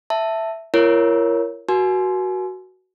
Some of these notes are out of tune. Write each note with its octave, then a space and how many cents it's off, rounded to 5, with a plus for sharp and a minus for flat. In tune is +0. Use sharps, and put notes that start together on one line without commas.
E5 +0 A5 +10
F4 -45 A#4 +0 C#5 +0
F#4 +10 A#4 +45 G#5 +40